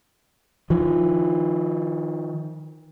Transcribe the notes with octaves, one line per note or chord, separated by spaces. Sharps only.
D#3 F3